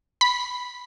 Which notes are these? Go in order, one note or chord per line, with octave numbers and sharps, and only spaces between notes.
B5